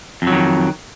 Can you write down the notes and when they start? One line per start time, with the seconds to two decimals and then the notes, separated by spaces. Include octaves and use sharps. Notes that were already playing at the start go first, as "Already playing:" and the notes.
0.22 F2
0.27 F#3
0.32 D#3